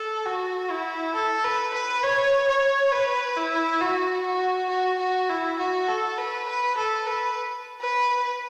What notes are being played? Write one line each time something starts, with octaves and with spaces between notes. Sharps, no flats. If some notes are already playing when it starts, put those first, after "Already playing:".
Already playing: A4
F#4
E4
A4
B4
B4
C#5
C#5
B4
E4
F#4
F#4
F#4
F#4
E4
F#4
A4
B4
B4
A4
B4
B4